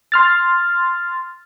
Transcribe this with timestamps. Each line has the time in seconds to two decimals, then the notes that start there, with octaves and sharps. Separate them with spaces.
0.12 C6 F6 A6